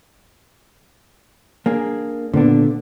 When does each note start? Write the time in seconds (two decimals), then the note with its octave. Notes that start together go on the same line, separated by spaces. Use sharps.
1.66 A#3 D4 G#4
2.34 A#2 D3 B3 D4